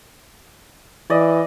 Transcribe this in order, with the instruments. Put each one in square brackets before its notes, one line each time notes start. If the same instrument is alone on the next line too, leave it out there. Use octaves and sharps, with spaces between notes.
[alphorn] E3 [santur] D5 D#5